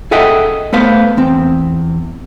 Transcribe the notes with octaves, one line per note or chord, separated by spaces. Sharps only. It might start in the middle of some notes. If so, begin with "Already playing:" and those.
G#4 A4 D#5 E5 F#5 G5
A3 B3 B4 C5 F5
E2 C4